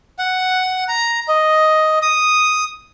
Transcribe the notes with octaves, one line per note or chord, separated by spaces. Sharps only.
F#5
A#5
D#5
D#6